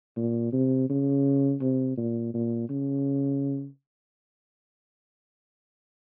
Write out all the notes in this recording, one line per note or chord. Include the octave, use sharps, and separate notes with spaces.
A#2
C3
C#3
C3
A#2
A#2
C#3